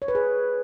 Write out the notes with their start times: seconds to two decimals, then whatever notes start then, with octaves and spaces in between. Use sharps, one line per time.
0.02 C#5
0.08 B4
0.15 G#4